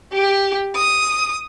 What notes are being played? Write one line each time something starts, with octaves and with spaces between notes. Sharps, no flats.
G4
D#6